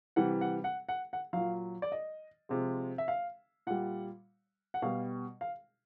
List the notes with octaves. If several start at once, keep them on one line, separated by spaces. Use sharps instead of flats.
C3 E3 G3 F#5
F#5
F#5
F#5
F#5
A#2 F#3 F5
D5
D#5
C3 F3 G#3
E5
F5
A#2 G3 F#5
F#5
B2 G3 F5
F5